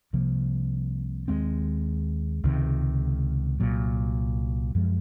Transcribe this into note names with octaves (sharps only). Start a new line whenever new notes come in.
C2 C3 F3 A#3
D#2 D#3 G#3 C4
C#2 C3 D#3
C2 A#2 F#3
F#2 F3 G#3